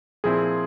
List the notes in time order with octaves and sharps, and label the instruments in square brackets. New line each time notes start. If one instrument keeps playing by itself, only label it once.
[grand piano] A#2 F3 C4 E4 [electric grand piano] G#4